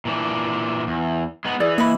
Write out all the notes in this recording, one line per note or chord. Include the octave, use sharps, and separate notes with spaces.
A#2 E3 D4
E2
G#3 B3 D#4
E3 G#4 D5
A#3 D#5 E5 B5